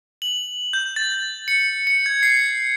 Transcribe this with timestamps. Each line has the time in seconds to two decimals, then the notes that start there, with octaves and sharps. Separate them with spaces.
0.22 F#7
0.73 G6
0.96 A6
1.48 C#7
1.87 C#7
2.06 G#6
2.23 C7